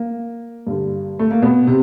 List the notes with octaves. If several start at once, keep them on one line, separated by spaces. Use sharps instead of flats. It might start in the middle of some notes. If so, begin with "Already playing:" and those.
Already playing: A#3
G2 D3
A3
A#3
B2 B3
C3